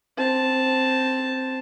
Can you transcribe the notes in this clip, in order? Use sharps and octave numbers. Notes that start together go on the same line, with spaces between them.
C4 A5